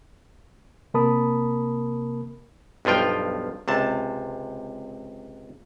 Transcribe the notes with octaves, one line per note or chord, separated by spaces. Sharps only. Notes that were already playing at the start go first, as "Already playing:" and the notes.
C3 A#3 A#4 A5 B5 D#6
B1 G2 F3 F4 G5
C#2 C3 A5